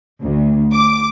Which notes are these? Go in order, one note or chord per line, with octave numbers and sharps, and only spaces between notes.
D2
D6